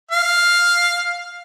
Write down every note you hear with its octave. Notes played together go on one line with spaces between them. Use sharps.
F5